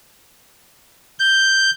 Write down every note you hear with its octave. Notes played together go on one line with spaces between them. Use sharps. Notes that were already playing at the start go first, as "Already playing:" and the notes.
G6